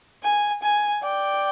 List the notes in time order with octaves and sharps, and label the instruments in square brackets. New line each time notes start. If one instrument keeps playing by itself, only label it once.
[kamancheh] G#5
G#5
[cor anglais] D5 [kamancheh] G5